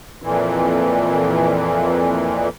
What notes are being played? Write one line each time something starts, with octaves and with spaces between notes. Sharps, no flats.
F2 A#2 E3